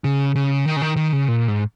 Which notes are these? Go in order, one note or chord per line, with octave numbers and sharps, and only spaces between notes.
C#3
C#3
D#3
C#3
D#3
D#3
C#3
A#2
G#2